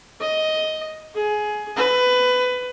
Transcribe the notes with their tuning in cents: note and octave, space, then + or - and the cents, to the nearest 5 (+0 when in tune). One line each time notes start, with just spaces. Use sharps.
D#5 +10
G#4 +20
B4 +20